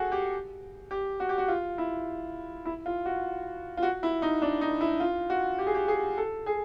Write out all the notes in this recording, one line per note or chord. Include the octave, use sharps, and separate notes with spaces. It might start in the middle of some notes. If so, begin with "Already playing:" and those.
Already playing: F#4 G#4 A4
G4
G4
F#4
G4
F#4
F4
E4
E4
F4
F#4
F4
F#4
E4
D#4
D4
D#4
E4
F4
F#4
G4
G#4
G4
G#4
A4
G#4